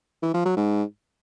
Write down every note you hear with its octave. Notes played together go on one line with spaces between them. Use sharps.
E3
F3
F#3
G#2